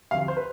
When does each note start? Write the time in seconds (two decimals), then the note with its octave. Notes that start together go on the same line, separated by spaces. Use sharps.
0.11 D2 C3 F3 F5
0.28 C5
0.37 B4